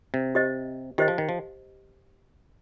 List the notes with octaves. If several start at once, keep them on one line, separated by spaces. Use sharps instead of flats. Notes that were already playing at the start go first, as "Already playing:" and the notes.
C3
G4 C5 D#5
D#3 G4 C5 D#5
F3
D#3
F3